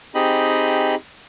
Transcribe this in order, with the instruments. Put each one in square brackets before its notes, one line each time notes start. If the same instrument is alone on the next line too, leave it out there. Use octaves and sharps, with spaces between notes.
[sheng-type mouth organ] C4 D#4 G4 G#4 D#5 B5